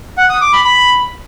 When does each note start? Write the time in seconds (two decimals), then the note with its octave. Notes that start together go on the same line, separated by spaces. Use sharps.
0.18 F#5
0.29 D#6
0.41 D6
0.53 B5
0.65 B5